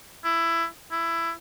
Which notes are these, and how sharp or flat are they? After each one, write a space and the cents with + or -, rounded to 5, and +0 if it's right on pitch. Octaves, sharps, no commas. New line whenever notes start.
E4 +15
E4 +15